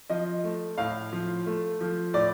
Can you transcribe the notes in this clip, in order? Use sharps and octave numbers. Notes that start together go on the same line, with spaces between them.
F3 D#5
A3
A2 F5
F3
A3
F3
A2 D5